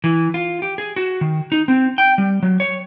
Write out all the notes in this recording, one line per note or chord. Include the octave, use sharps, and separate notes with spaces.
E3
F4
G4
G#4
F#4
D#3
D#4
C4
G5
G3
F#3
C#5